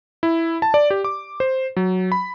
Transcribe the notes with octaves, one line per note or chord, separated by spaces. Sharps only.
E4
A5
D5
G4
D6
C5
F#3
B5